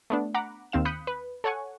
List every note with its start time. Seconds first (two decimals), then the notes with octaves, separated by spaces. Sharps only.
0.10 A3 B3 D4
0.35 F#5 A#5 B5 D6
0.72 D#2 C4 F5 E7
0.85 B5 D#6 F#6 G6 B6 C#7
1.07 B4
1.44 A4 C#5 F#5 G#5 C#6